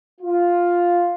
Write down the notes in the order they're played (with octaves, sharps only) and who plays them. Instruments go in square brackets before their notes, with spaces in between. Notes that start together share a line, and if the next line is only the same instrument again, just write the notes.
[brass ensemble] F4